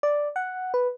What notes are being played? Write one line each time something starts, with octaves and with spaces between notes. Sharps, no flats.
D5
F#5
B4